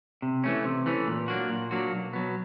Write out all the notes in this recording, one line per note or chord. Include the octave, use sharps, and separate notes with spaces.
C3
E3 A3 C#4
C3
E3 A3 C#4
A#2
F#3 A#3 D4 F#4
A#2
F#3 A#3 D4 F#4
B1
B2 F#3 B3